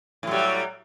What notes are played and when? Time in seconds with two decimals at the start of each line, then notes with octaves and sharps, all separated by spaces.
0.23 A2
0.27 F#3
0.31 G3